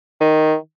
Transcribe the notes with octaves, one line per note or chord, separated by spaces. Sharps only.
D#3